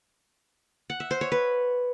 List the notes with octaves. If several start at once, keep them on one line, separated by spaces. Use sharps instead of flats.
F#5
E5
C5
C#5
B4